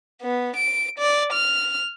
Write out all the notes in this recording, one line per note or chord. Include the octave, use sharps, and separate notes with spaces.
B3
D7
D5
F6